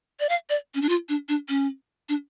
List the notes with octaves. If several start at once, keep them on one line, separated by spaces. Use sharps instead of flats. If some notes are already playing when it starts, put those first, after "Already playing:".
D5
F5
D5
C#4
D4
F4
D4
D4
C#4
D4